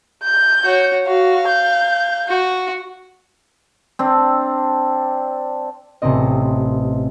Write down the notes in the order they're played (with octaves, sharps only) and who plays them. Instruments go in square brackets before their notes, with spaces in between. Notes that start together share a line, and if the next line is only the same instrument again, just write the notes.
[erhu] G6
[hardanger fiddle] F#4 C#5
[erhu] F#4 [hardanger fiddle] F5
[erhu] G6
[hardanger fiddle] F#4
[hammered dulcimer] C4 D4
[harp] A1 C3 B3 C4 D#5